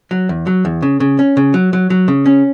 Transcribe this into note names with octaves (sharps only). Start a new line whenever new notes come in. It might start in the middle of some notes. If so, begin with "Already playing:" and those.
F#3
E2
F#3
E2
C#3
C#3
C#4
C#3
F#3
F#3
F#3
C#3
C#4